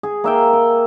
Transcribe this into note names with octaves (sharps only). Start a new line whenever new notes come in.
G#4
A#3 E5 G5
G5